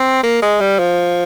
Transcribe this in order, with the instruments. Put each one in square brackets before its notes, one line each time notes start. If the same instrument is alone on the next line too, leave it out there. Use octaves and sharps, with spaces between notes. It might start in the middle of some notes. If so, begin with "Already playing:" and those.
Already playing: [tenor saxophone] C4
A#3
G#3
G3
F3